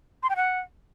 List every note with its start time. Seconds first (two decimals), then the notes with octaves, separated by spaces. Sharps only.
0.23 C6
0.29 G5
0.36 F#5